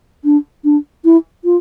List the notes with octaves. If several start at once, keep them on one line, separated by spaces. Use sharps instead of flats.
D4
D4
E4
F4